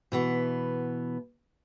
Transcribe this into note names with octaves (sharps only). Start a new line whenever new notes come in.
B2 E3 B3